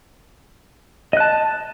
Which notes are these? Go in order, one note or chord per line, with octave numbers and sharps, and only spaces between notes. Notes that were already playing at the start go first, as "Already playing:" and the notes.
D#5 A5 F#6